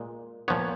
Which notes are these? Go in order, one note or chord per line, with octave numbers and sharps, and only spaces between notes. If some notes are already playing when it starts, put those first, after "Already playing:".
Already playing: A#2 G#3
A#2 F3 B3 C#5